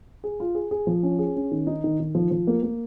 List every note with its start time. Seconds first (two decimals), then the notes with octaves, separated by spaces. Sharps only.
0.24 G#4
0.40 F4
0.55 G#4
0.71 G#4
0.87 F3
1.03 C#4
1.19 G#4
1.36 C#4
1.51 D#3
1.67 D#4
1.84 D#3
2.00 D#3
2.15 F3
2.31 F3
2.47 A#3
2.63 A#3